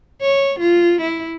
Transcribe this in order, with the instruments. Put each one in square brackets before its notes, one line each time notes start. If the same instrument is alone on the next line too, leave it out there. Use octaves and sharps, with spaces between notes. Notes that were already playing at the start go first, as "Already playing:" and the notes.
[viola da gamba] C#5
F4
E4